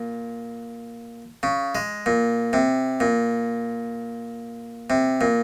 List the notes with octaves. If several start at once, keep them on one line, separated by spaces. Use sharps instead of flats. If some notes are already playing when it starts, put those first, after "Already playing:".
Already playing: A#2
C#3
G#3
A#2
C3
A#2
C3
A#2